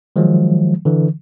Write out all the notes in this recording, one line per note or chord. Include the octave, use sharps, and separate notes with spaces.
D#3 F3 F#3 G#3
D3 E3